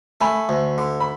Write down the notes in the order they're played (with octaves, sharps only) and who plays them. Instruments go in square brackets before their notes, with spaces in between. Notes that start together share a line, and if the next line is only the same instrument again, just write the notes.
[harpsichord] A3 [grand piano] G#5 B5
[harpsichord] D2
D3
[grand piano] B5